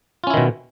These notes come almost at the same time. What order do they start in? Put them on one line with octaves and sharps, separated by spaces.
F4 C#4 E4 D#3 B2